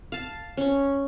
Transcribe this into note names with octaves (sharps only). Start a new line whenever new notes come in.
F5 A5
C#4 C#6